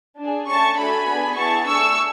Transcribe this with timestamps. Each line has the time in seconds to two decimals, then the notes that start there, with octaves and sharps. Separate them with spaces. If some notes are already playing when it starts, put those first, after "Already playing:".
0.19 D4 G#4
0.48 A3 C#4 G#4 A5 C#6
0.78 A3 D4 F#4 A4 G#5 B5
1.08 B3 D4 G#4
1.37 B3 E4 G#4 A5 C#6
1.67 A3 D4 G#4 C#6 E6